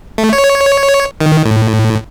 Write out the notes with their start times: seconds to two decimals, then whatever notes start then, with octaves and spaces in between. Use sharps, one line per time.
0.18 A3
0.33 C#5
1.21 D#3
1.45 A2